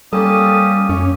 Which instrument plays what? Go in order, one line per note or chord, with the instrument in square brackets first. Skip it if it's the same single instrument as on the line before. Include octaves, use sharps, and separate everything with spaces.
[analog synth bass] G3 [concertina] A#3 C#4 G4 [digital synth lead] A4 [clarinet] D#6
[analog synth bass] F#2 [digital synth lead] C#4